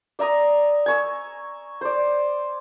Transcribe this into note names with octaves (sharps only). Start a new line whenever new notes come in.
D5 E5 A#5 D#6
G#5 C#6 E6
C5 D5